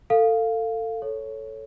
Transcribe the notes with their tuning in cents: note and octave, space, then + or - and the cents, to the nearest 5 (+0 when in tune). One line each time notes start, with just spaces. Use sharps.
A4 +25 F5 +0
A4 +0 C#5 +0